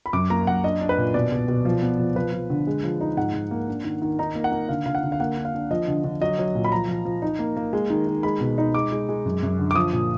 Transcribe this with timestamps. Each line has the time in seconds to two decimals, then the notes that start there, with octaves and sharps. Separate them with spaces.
0.06 B5
0.13 F#2 D6
0.30 A#3 A#5
0.47 F#2 F#5
0.64 D4 D#5
0.81 D4
0.89 B4
0.98 A#2
1.14 B2 D5
1.32 B2
1.48 B2
1.65 F3
1.82 B3
2.00 F3
2.16 F3 B4
2.33 F3
2.50 D3
2.67 G#3
2.83 F3
3.01 D#4
3.17 G#2 F#5
3.34 G#2
3.51 A#3
3.68 D4
3.84 D#3
4.02 D#3
4.19 D#4 A#5
4.35 A#3
4.44 F#5
4.52 A#3
4.69 D3 F5
4.86 D3 F5
4.95 F#5
5.03 D3
5.12 F5
5.20 A#3 F#5
5.37 D4
5.45 F5
5.54 D4
5.71 F3 D#5
5.87 D3
6.04 D3
6.21 F#3 D#5
6.38 F#3
6.55 A#2
6.65 B5
6.72 F3 A#5
6.88 F3
7.05 F3
7.22 D#4
7.39 A#3
7.57 A#3
7.73 G#3
7.90 D#3
8.07 D#3
8.23 G#3 B5
8.40 B2
8.58 D#4
8.74 G#3 D6
8.92 G#3
9.09 G#3
9.26 F#2
9.43 F#2
9.59 D3
9.71 D6
9.75 F3 D#6
9.93 A#2